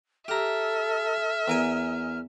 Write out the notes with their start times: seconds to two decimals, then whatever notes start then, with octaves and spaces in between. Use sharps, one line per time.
0.28 G4 A4 E5 A#5 F6
1.48 E2 A#4 G#5